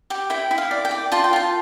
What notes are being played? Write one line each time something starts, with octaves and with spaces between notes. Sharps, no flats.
G4
E4 G5
E4
F5
D5
G5
D5
F4 A5
G5
F4 A5